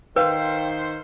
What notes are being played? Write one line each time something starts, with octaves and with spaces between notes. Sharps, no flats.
D#3 B4 C5 F5 G5